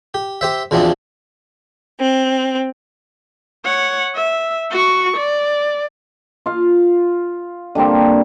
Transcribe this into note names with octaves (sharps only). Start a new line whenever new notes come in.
G4
G4 C5 E5
E2 B2 E3 F3 C4 D4
C4
C#5 F#5
E5
F#4 C#6
D5
F4 F5
D3 G3 A#3 C4